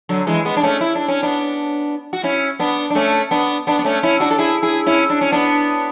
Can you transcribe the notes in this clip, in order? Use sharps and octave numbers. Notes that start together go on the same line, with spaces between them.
D3 F#3
E3 G#3
G#3 B3
D4
A3 C#4
E4
D4
C#4
B3 D4
F#4
C#4 E4
B3 D4
D4
A3 C#4
B3 D4
B3 D4
B3
A3 C#4
C#4 E4
D4 F#4
A4
E4 G#4
E4 G#4
C#4 E4
D4
C#4
B3 D4